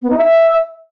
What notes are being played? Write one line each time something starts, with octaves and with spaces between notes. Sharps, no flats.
B3
D#4
E5